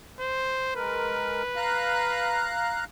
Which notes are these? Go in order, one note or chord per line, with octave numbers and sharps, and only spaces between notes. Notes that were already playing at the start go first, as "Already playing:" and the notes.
C5
G#3 A#4 B4
F5 A#5 F#6